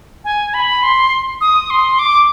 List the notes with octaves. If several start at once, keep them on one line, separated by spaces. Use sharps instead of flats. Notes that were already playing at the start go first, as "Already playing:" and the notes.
G#5
B5
C6
D#6
C6
D6